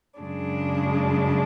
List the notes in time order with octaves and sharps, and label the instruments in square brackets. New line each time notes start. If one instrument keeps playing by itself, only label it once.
[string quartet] F#2 C#3 G#3 D4